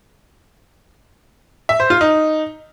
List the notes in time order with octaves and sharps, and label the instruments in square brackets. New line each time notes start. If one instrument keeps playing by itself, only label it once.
[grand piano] E5
C5
F4
D#4